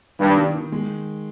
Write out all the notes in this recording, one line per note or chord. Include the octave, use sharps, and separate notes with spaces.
G2 D#3
D#3
D#3
G#3